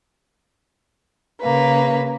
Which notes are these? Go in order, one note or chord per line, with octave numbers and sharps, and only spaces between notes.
C#3 A#3 B4